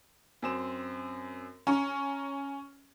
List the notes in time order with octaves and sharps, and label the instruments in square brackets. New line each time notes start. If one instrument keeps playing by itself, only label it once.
[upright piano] F#2 C4 E7
[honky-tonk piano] C#4 [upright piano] A#5 C#6